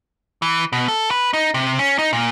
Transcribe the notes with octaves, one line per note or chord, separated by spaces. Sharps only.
E3
B2
A4
B4
D#4
C3
C#4
D#4
A#2